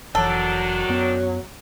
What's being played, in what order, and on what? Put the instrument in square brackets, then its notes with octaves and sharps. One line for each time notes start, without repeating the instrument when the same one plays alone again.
[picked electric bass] F1 E3 [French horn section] D#3 D4 [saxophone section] F#3 [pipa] A4
[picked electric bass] F#2 B3